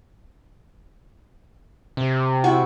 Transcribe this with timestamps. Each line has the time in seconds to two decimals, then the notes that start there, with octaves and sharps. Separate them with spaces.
1.97 C3
2.44 E4 F#4